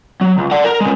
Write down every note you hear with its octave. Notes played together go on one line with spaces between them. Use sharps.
F#3
C#2
D5 F#5
A#4
C#3 G#3